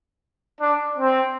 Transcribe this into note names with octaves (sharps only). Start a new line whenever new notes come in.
D4
C4